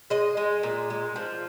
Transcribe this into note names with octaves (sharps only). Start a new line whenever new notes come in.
G#3 D#5
G#3
A#2
G#3
F3